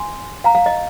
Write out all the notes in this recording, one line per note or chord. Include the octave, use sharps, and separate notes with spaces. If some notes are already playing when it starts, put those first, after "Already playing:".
Already playing: G#5 C6
F5 A#5
F5
D#5